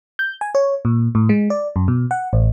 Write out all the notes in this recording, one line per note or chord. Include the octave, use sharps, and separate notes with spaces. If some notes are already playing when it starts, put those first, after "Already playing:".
G6
G#5
C#5
A#2
A2
G#3
D5
F#2
B2
F#5
A1